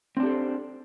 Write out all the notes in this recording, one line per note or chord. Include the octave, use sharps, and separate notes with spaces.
C4 D4 G4 A4 C5